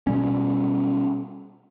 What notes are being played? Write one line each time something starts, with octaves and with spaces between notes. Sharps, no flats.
B2 G3 C#4